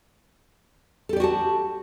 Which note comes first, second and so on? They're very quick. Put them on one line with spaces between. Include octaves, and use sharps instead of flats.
A4 G4 D5 F#4 A5